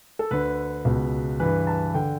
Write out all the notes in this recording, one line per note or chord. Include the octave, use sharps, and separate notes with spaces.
A4
D2 D3 B4
C#2 B2
G2 E3 B4
A5
D3 G5